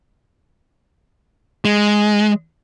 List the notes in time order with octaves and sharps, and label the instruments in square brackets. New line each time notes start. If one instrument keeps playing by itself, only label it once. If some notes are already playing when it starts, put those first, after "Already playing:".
[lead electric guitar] G#3